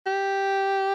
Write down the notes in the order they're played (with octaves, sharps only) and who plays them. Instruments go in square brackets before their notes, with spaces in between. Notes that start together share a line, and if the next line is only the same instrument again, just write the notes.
[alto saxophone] G4